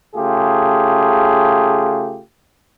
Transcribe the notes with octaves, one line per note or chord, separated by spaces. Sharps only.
C#3 A3 F4 G4 G#4